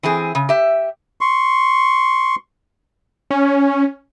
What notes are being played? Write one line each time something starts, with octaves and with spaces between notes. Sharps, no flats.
E3 C4 G#4
C#3
G4 E5
C6 C#6
C#4